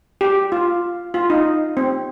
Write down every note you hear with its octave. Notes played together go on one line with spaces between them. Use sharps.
G4
F4
F4
D#4
C4